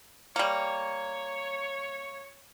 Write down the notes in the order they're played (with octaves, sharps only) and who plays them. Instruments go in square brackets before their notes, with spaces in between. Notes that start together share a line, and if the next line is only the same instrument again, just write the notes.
[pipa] G3 A#3 [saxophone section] C#5